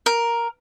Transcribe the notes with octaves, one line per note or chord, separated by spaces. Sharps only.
A#4